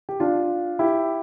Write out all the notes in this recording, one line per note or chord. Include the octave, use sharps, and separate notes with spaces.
G4
D4 F4
E4 G4